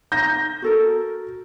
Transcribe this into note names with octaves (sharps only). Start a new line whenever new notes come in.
D#4 G6 A#6
F#4 A4 A#4